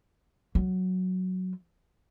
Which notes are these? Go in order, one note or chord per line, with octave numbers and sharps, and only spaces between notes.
F#3